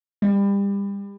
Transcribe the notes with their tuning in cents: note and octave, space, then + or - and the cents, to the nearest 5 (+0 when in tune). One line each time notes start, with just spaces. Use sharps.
G3 +30